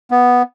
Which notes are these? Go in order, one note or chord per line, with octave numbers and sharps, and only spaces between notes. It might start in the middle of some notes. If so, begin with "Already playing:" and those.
B3